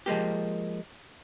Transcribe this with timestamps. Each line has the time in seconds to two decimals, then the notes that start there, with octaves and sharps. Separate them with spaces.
0.06 F3 G#3 A#3 G4